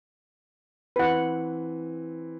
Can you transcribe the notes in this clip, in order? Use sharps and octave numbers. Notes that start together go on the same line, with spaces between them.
E3 C4 B4 F#5